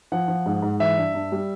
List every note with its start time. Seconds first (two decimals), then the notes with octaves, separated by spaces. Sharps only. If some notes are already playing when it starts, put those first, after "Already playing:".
0.12 F3 F#5
0.28 F3
0.46 G#2
0.62 G#2
0.80 E3 E5
0.97 G2
1.15 G2
1.32 G3